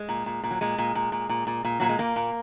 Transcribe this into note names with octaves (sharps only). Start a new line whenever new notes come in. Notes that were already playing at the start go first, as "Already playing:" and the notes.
Already playing: G#3
A#2
A#2
A#2
F#3
A#2 G#3
A#2
A#2
A#2
A#2
A#2
A#2
A#2 F#3
G#3
A#2 A#3
A#2